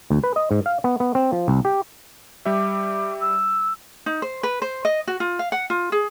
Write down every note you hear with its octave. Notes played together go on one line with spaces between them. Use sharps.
D2
B4
D#5
G#2
F5
B3
B3
C4
F3
C2
G4
G3 G4 E5 D6
E6
D#4
C5
B4
C5
D#5
F#4
F4
F5
F#5
F4
G#4